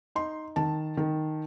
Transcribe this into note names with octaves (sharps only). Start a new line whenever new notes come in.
D#4 C6
D#3 A5
D#3